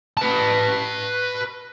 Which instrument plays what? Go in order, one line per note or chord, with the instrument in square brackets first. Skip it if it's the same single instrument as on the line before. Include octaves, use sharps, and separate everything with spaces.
[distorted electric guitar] B4 A5